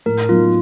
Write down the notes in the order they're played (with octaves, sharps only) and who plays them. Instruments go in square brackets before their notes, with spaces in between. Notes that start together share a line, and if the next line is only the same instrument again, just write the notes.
[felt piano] A2 [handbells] A#4
[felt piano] F#3 B3 D#4 [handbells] F4